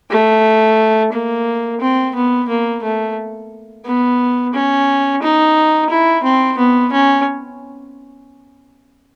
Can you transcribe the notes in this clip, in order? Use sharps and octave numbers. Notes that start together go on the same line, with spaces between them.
A3
A#3
C4
B3
A#3
A3
B3
C#4
D#4
E4
C4
B3
C#4